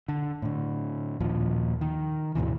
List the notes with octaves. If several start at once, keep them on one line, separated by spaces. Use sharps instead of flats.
D3
A2 D3
D#2 A#2 F3
D#3
D2 G#2 B2 E3